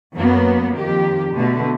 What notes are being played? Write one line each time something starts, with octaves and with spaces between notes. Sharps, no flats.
F#2 F#3 A#3 B3
F2 D#3 G4
B2 D3 A3